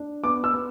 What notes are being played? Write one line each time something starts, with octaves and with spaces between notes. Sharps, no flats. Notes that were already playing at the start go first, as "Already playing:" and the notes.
Already playing: D4
B3 D6
E6
B3